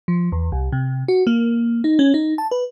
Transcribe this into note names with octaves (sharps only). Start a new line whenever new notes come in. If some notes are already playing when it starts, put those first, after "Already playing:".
F3
E2
C2
C3
F#4
A#3
D#4
C#4
D#4
A5
B4